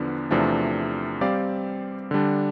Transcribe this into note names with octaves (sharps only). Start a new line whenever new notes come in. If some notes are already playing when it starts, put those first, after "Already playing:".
Already playing: E2 D3 F3 B3 D4
E2 C3 F3 A3 D4
G3 C4 G4 D5 F5
D3 G3 D4